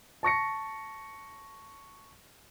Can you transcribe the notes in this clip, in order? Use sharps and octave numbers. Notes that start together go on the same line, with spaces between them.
A5 C#6 A#6 C#7